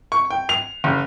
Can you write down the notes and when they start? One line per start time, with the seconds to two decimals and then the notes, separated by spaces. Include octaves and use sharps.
0.12 C#6
0.30 G5
0.49 F7
0.84 F#1